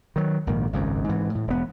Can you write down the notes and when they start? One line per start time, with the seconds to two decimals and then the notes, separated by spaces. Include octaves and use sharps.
0.16 D#3 F#3
0.47 A#1 G#2 D#3 A#3
0.73 G#1 C#2 F#2
1.09 G#2 E3
1.35 A2
1.47 E1 B3